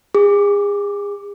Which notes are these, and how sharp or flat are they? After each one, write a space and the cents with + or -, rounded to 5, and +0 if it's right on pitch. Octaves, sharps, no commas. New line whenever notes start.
G#4 -35 D6 +10